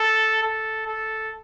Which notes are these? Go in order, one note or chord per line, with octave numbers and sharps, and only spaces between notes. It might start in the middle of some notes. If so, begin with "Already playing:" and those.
Already playing: A4
A4
A4